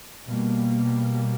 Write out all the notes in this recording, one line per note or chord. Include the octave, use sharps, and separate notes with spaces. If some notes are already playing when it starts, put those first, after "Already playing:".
B2 G3 A#3